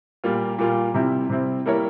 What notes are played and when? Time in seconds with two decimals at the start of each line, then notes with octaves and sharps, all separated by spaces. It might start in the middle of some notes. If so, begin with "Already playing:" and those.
0.24 A#2 G3 A#3 F4
0.59 A#2 G3 A#3 F4
0.94 C3 G3 C4 E4
1.29 C3 G3 C4 E4
1.66 G3 A#3 E4 A#4 C#5